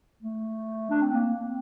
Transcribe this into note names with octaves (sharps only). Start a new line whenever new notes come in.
A3
D4
C4
A#3
C4